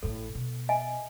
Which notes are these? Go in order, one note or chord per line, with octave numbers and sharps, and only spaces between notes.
A1 A2 A4
B2
D#5 E5 G#5